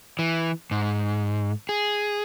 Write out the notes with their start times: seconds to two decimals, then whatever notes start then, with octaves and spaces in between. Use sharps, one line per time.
0.19 E3
0.71 G#2
1.69 G#4